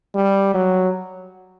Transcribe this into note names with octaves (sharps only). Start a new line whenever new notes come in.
G3
F#3